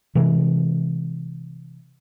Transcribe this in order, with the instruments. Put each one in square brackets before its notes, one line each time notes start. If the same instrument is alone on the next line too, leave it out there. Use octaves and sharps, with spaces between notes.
[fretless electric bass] C3 E3 G#3